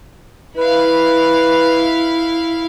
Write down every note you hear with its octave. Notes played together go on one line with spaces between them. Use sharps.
E4 B4 F5